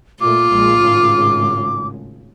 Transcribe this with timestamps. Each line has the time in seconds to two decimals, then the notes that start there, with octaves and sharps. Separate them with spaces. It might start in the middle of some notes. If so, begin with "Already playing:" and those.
0.21 A#2 A3 F4 D6
0.50 A#1 A#2 G#3
0.80 G#1 A2 C#3